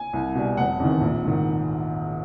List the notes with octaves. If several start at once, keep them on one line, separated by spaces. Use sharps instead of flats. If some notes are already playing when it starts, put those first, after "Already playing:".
Already playing: G#5
C2
B2 G3
F1 F#5
E2 C3 D#3
A#1
G#2 D#3